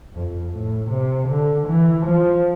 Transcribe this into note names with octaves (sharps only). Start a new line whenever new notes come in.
F2
A2
C3
D3
E3
F3